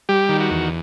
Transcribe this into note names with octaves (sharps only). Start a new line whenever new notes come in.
G3 G4
D#3
F#4
E2